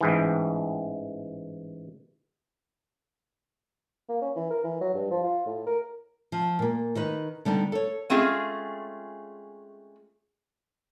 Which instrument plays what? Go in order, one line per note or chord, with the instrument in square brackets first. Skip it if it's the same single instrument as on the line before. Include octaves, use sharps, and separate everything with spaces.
[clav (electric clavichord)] A1 G#2 E3
[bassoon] A#3
C#4
E3
A#4
E3
F#3
G2
F3
F4
A2
A#4
[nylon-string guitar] F3
A#2 A#3
D#3 D#4 B4
D3 G3 B3 D#4
A4 C#5
[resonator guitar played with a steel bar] G#3 A3 C4 C#4 F4 G#4